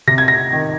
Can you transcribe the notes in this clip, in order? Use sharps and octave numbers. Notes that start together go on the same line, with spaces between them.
C3 A#6
G#6
A#6
D#3